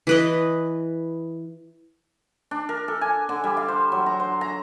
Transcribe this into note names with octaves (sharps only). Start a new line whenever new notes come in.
E3 B4 D#5
D4
A#4
A4
G#5
D3
G3
F5
C5
F#3
A#5
C5
A#5